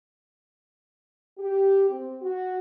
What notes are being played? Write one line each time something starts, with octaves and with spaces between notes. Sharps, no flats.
G4
C4
F#4